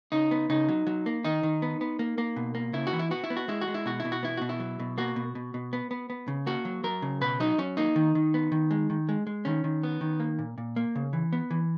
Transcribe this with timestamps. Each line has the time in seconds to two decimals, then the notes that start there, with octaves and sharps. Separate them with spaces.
0.12 C#3 D#4
0.31 B3
0.50 C#3 D#4
0.69 F#3
0.87 F#3
1.06 A#3
1.25 D#3 D#4
1.43 D#3
1.62 B3
1.81 B3
1.99 A#3
2.18 A#3
2.36 B2
2.55 A#3
2.73 C#3 E4
2.87 F#4
2.93 E3
2.99 E4
3.11 B3 F#4
3.24 E4
3.30 B3
3.37 F#4
3.48 G#3 E4
3.61 F#4
3.67 G#3
3.74 E4
3.86 B2 F#4
4.00 E4
4.05 B2
4.12 F#4
4.23 B3 E4
4.37 B2 F#4
4.49 E4
4.60 F#3
4.80 B2
4.98 A#3 F#4
5.16 B2
5.35 B2
5.54 B2
5.73 B3
5.91 B3
6.10 B3
6.28 C#3
6.47 A#3 F#4
6.65 F#3
6.84 F#3 A#4
7.02 C#3
7.21 B2 B4
7.40 F#3 D#4
7.58 F#3 C#4
7.77 A#3 D#4
7.96 D#3
8.15 D#3
8.34 B3
8.52 D#3
8.71 G#3
8.90 D#3
9.09 G#3
9.27 G#3
9.45 D#3 C#4
9.64 D#3
9.83 B3
10.01 D#3
10.20 A#3
10.39 A#2
10.58 A#2
10.76 A#3
10.95 C#3
11.13 E3
11.33 B3
11.51 E3